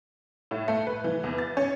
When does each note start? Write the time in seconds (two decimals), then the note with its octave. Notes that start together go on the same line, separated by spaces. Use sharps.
0.51 A2
0.68 A3
0.87 B4
1.04 E3
1.24 E2
1.38 A6
1.57 C#4